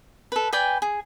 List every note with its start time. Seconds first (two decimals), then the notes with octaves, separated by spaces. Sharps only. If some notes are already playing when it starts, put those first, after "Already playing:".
0.32 A4 B4
0.53 B4 D5 G5 G#5
0.82 G#4